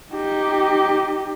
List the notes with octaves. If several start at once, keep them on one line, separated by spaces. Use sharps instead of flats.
D#4 G4